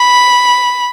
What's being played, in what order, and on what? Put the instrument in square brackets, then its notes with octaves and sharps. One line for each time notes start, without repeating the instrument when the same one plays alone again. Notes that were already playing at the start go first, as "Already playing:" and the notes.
Already playing: [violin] B5